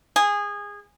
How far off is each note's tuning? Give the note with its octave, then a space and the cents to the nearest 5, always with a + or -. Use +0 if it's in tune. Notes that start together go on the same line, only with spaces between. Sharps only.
G#4 -20